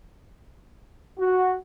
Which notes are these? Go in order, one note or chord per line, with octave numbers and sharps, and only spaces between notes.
F#4